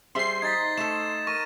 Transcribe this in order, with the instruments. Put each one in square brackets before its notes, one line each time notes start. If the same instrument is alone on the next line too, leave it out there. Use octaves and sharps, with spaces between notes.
[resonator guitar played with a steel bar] G3 G#4 E5 [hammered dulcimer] C5 [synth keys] C6 C7
[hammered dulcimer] D#4 A#5 [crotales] G#6 A6 B6
[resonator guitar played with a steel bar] A3 A4 [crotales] E7
[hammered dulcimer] A#4 [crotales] C#6 A#6 D#7